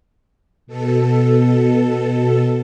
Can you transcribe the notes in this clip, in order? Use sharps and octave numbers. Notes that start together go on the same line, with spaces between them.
B2 A4